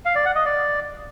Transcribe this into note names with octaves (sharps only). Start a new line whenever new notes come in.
F5
D5
F#5
D#5
D5